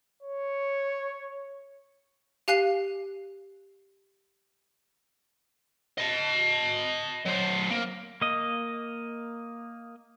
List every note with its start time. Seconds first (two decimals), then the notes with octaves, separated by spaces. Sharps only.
0.23 C#5
2.48 G4 F5 G#5 F#6 C7
5.98 D#5 A5
7.26 F#3 C5
7.70 A#3
8.22 A#3 D#5